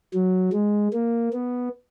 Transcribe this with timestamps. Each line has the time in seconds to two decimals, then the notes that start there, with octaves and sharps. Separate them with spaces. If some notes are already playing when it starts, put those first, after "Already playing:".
0.14 F#3
0.53 G#3
0.93 A#3
1.33 B3